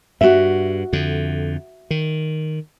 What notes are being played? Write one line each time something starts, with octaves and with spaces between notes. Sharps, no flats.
G2 F#4 E5
F2 D3
D#3